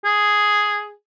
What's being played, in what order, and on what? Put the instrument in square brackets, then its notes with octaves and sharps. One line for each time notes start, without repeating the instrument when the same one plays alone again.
[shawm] G#4